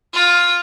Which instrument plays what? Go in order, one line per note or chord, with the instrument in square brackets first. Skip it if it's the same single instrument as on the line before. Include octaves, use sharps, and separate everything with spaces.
[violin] F4